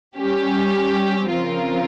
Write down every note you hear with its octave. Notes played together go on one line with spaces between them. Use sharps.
G3 C#4 G4
C#3 F3 C4 F4 A#4